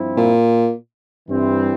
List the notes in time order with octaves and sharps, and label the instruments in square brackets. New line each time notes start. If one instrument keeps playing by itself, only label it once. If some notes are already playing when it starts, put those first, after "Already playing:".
Already playing: [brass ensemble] G2 F3 C4 E4
[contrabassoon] A#2
[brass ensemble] G2 E3 G3 C4 E4